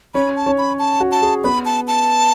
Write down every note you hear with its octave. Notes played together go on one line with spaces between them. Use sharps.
C#4 C#5 B5
A5
C#4 C#5
B5
A5
F#4
A5
G#4
B3 B4 B5
A5
A5